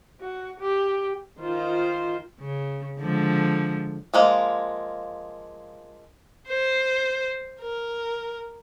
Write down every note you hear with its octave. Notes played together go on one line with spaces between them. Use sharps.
F#4
G4
D#3 F4 C5
C#3
D3 F3 G#3
F3 G#3 A#3
C5
A#4